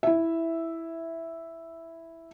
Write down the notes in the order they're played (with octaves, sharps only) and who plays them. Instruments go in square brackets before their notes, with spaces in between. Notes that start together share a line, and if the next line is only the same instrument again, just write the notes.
[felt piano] E4 E5